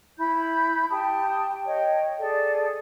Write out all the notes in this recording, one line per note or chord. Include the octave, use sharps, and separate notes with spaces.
E4 B5 G6
G4 G5 A5 D#6
C#5 D#5 G5
G#4 A4 D5